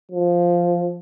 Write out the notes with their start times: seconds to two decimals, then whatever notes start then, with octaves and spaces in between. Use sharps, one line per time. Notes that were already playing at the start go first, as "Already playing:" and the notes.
0.12 F3